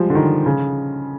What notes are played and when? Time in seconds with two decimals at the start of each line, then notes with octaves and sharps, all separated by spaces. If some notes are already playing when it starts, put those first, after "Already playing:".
Already playing: F3 G3 G#3
0.10 D3
0.15 D#3
0.46 C#3